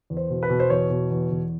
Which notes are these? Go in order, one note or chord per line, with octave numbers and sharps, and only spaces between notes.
E2
C5
B2
B4
B2
C5
E2 C#5
B2
E2
E2